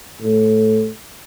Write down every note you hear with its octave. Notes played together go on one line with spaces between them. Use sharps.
A2